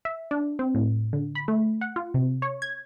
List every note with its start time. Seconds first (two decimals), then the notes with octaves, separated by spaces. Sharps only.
0.05 E5
0.31 D4
0.59 C4
0.75 A2
1.13 D3
1.35 B5
1.48 A3
1.81 F#5
1.96 F4
2.14 C3
2.42 C#5
2.62 G#6